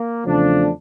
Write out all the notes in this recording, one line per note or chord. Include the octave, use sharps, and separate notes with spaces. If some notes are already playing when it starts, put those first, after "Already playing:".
Already playing: A#3
E2 C#3 F3 A3 D4